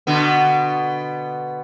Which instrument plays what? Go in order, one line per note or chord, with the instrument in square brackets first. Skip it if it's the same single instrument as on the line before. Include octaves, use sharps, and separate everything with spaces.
[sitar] B2 D3 B3